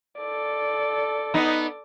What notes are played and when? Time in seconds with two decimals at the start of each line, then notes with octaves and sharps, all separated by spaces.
0.18 A4 D5
1.34 B3 D#4